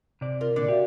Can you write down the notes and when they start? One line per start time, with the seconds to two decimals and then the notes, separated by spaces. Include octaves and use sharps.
0.21 C3 D5
0.41 F4 A#4
0.56 A#2 D3 D5
0.68 F#4 G4 E5 F5